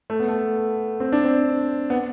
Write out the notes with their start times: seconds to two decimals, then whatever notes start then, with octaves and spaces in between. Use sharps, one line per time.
0.10 A3
0.20 B3
0.28 A3
1.00 C4
1.12 D4
1.24 C4
1.90 B3